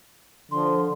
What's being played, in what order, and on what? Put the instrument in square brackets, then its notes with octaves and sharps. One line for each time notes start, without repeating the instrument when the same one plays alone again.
[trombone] D3 [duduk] F3 [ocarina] C6